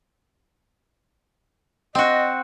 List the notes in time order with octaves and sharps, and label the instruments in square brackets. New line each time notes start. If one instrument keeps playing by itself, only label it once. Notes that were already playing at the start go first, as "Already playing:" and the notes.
[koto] C4 F#4 [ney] D#5